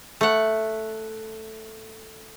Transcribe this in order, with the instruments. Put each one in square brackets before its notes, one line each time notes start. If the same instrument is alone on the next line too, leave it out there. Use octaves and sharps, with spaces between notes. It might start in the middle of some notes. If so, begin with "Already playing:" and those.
[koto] A3 F#5